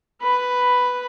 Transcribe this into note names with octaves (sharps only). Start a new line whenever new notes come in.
B4 B5